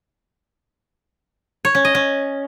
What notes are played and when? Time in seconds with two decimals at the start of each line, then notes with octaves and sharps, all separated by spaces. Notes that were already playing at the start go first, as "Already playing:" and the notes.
1.65 C#5
1.75 C#4
1.85 D#5
1.95 C#4